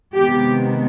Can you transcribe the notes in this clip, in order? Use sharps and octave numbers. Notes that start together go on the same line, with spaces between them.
C3 D#3 G#3 B3 G4